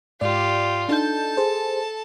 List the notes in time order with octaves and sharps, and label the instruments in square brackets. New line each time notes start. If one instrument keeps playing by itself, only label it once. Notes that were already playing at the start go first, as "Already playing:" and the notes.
[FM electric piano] G#2 D5 [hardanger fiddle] F4 G4
[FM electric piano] D4 D#4 G6 [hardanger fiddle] A4 A5
[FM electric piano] G#4 C5